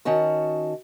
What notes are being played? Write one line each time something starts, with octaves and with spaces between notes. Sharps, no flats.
D#3 C#4 F#4 A5